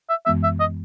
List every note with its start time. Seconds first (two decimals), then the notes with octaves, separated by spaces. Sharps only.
0.09 E5
0.26 F#2 E3 G#3 B3 E5
0.43 E5
0.60 D#5